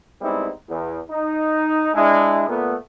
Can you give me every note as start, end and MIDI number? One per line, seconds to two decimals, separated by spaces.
0.21 0.50 55
0.21 0.50 56
0.21 0.50 59
0.21 0.50 60
0.21 0.50 63
0.21 0.50 64
0.69 0.99 40
1.10 1.89 63
1.94 2.46 56
1.94 2.46 62
1.94 2.46 64
2.49 2.75 46
2.49 2.75 57
2.49 2.75 59